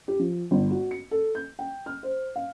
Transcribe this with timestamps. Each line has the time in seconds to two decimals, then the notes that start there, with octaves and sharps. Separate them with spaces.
0.08 G4
0.19 F3
0.51 G1
0.71 F#4
0.91 C#7
1.11 A4
1.35 G6
1.59 G5
1.86 F6
2.03 C5
2.36 F5